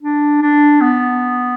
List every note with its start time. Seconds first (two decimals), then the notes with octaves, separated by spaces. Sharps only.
0.03 D4
0.42 D4
0.81 B3